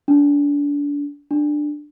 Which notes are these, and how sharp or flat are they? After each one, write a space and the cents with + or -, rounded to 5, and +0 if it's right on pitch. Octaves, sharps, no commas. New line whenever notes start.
D4 -30
D4 +15